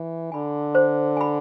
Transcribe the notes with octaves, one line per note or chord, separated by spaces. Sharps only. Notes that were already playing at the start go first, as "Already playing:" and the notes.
Already playing: E3
D3 G#5 B5
C5
G#5 B5